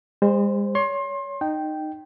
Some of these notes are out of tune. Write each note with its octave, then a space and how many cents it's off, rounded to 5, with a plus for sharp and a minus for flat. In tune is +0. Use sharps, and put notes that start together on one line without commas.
G#3 -40 C5 +0
C#5 +25 C6 +30
D#4 -15 G5 -5